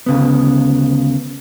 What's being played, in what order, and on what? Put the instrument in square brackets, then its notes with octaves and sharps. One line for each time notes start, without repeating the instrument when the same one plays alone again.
[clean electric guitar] D2 C#3 B3